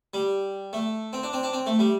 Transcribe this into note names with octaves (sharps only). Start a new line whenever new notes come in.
G3
A3
C4
D4
C4
D4
C4
A3
G3